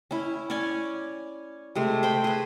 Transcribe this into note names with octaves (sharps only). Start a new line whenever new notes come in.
C#4 E4
C#4 C#5 D5 G#5
C3 G#3 A3
C5 G5 B5
G#4 B4